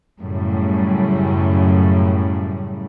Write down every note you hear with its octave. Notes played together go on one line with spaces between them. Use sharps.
F#2 A2 C#3 G3